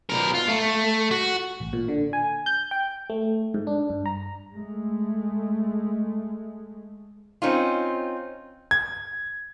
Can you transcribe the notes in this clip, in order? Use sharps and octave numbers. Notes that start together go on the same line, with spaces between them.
B2 A#4
F4
A3
F#4
A1
A#2
D3
G#5
G6
G5
A3
G#2
D4
G2
A#5
G#3 A3
C4 C#4 D#4 F4
G#6